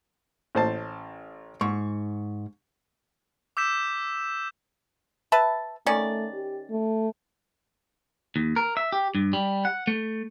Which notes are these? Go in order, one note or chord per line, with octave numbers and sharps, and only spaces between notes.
A1 C5 A5
G#2 C#6
D6 E6 G6 B6 E7
B4 E5 A5
D#3 A3 C#4 D5
G4
A3
D#2
A#4
E5
G4
G2
G3
F#5
A3